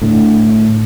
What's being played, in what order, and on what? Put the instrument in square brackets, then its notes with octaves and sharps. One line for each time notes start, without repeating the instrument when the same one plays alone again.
[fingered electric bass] A2 D3